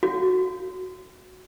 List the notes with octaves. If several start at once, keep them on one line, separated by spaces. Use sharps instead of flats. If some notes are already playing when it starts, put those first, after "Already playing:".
F#4